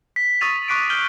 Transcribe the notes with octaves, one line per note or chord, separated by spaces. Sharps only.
B6
C#6 D#6 E6 A6 D#7 F7
C#6 D6 F#6 B6 C7 D7
F6 G6 F#7 G7